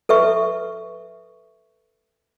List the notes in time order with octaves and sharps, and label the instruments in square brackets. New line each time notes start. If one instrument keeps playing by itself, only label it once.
[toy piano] A4 B4 E5 C#6